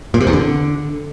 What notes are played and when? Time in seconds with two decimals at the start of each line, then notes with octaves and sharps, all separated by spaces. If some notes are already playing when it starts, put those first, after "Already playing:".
0.14 A#2
0.20 C3
0.27 E2
0.33 D3